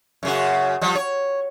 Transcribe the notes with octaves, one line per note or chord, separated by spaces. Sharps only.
F#2 C#3 F#4
F3 G3
C#5